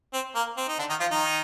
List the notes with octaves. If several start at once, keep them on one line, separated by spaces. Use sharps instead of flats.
C4
A#3
C4
D#4
D3 D4
D#3 D#4
F3 F4
D#3 D#4